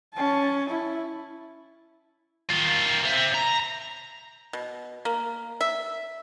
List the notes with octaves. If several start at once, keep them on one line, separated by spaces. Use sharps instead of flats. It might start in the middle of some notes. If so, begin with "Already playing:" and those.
C#4 A5
E4
D#3 F4
C5 E5
A#5
B2
A#3
E5